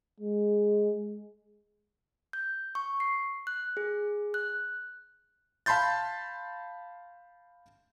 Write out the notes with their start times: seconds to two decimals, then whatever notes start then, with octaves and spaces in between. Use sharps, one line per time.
0.20 G#3
2.33 G6
2.75 C#6
3.00 C7
3.47 F#6
3.77 G#4
4.34 F#6
5.66 F5 A5 B5 C6 G6 A6